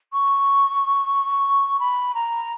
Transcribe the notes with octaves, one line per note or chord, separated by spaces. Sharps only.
C#6
B5
A#5